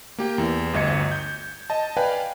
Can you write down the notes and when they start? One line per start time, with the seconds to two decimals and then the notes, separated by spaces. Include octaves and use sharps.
0.18 A#3 G4 G5
0.38 E2
0.73 G1 D2 D#5 G#6 C#7
1.12 G6
1.70 D#5 A5
1.97 B4 D5 F5 G5 G#5